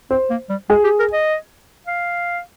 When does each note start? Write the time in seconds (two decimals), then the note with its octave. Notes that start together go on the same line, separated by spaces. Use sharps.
0.11 C4 C5
0.30 A#3
0.49 G3
0.69 G#3 G#4
0.84 G4
0.99 A#4
1.13 D#5
1.87 F5